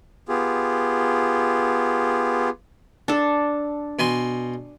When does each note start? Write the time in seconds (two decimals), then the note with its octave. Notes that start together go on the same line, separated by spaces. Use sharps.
0.29 B3 F4 G4 G#4
3.08 D4 A4
3.99 B2 G#5 C6